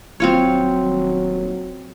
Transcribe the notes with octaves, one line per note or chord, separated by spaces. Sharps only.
D#1 F#3 C4 F4 C#5